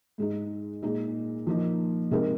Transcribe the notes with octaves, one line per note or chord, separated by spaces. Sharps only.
G#2 G#3 D#4
A#2 G#3 D#4 G#4
F3 A#3 D#4
C3 G#3 D#4 A#4